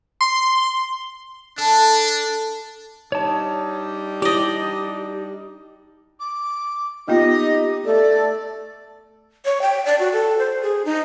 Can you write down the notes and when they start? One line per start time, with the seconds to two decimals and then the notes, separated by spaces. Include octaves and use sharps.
0.21 C6
1.58 D4 A4
3.12 G3 D4 D#4 C#5 A5
4.22 E4 G4 D5 D#5
6.19 D6
7.08 A#3 B3 D#4 F4 G4 D#5
7.85 A3 A4 D5
9.45 C#5
9.62 G5
9.85 D5
9.99 F#4
10.13 A4
10.38 C5
10.62 G#4
10.85 D#4